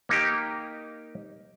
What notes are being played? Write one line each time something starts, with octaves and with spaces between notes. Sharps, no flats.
A#3 D#4 G4